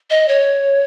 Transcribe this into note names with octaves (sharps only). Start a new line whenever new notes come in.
D#5
C#5